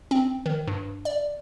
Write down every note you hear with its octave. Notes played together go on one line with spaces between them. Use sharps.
C4
D#3
G2
D5